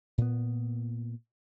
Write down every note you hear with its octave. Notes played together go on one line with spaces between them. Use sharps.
A#2 B3